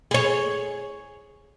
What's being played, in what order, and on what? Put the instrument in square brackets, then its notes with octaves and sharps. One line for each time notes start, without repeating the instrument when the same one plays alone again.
[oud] G#4 C#5